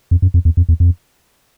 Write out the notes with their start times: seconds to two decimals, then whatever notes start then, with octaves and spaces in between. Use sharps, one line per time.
0.11 F2
0.22 F#2
0.34 F2
0.45 E2
0.57 F2
0.69 E2
0.80 F2